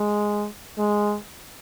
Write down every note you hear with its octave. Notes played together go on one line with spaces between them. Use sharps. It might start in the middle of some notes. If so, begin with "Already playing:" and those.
Already playing: G#3
G#3